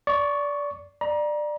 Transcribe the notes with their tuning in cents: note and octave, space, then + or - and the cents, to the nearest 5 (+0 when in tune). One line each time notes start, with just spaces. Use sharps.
D5 -20 C#6 +0
D5 +20 A#5 +30